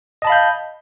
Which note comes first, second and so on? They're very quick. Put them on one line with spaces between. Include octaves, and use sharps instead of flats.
D#5 A5 B5 F5 G6